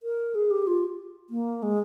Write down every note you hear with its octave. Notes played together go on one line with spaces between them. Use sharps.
A#4
G#4
G4
F4
A#3
G#3